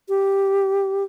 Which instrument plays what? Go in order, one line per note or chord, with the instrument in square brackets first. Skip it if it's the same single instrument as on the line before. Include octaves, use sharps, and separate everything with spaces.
[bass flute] G4